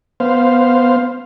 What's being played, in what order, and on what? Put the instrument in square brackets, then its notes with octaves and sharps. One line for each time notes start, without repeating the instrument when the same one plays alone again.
[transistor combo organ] B3 C5 F5